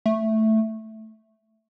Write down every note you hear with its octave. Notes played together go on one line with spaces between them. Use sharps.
A3